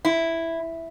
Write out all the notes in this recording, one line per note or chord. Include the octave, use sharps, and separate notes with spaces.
E4